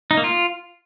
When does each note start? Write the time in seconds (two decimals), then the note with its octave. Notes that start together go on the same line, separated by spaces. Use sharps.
0.11 D#4
0.17 A#3
0.24 F4